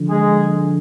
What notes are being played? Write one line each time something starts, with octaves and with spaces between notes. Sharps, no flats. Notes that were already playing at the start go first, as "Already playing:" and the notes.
Already playing: D3 F3
G#3 G#4